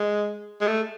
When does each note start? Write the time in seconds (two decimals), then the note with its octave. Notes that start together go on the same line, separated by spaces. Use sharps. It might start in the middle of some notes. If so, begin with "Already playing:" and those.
Already playing: G#3
0.61 G#3
0.67 A3